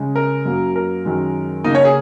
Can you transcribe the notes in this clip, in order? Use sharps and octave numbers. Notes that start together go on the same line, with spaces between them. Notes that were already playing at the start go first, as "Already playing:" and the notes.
Already playing: C#3 G#3
A#4
F#2 F#3 A#3
A#4
F#2 D#3 G#3
C#3 A#3 D#4 D#5
C#4 C#5
G#4